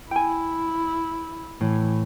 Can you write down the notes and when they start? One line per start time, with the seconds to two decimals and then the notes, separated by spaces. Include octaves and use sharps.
0.11 E4 G5 G#5
1.61 A2 E3